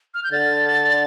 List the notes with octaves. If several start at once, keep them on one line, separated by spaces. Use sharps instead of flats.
F6
G6
D3 A6